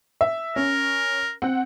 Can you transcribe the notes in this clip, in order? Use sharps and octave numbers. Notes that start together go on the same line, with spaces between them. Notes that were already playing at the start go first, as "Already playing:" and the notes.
E5
C#4 A#4
C4 F#5